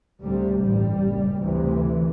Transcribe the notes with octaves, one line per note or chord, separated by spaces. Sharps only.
D2 C3 G3
A1 G2 G3
F#1 F#2
D2 C3 E3